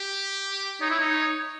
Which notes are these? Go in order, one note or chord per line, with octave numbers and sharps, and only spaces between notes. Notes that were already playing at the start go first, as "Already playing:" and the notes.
Already playing: G4
D#4 C#5
E4
D#4